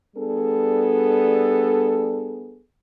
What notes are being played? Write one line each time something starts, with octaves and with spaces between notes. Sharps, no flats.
G3 B3 D4 G#4 A4